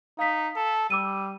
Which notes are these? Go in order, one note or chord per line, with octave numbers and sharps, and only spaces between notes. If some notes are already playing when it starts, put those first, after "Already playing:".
D#4 F5 B6
A4
G3 D6 E6 D#7